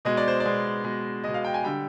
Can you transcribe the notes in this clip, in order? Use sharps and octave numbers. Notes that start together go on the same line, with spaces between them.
B2 G#3 D#5
D5
C5
D5
B2 G#3
B2 G#3
B2 G#3 D#5
F5
G5
G#5
D3 G3 G5